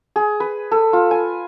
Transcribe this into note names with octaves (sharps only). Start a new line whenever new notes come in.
G#4
B4
A4
F4
G#5